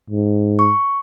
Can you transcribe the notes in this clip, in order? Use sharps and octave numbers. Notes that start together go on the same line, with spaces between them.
G#2
C#6